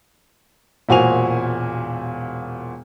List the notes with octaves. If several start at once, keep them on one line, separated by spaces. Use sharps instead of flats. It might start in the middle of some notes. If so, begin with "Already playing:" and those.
E1 A#2 F#4 C5 G#5 F7